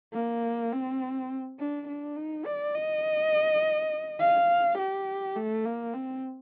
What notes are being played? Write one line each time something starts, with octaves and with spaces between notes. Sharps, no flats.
A#3
C4
D4
D4
D#4
D5
D#5
F5
G4
A3
A#3
C4